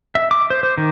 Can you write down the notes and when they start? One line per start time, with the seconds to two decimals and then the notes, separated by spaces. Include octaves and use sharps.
0.15 E5
0.31 D6
0.50 C5
0.63 C5
0.78 D#3